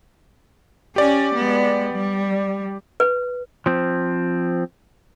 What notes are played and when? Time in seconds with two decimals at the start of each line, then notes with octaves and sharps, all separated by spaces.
0.96 C#4 G4 D5
1.34 G#3 B3
1.92 G3
3.00 B4
3.66 F3 C4